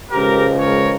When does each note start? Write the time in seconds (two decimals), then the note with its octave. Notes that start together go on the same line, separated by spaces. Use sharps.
0.11 C#2 C#3 F3 G#3 G4 A#4
0.60 A#4 C#5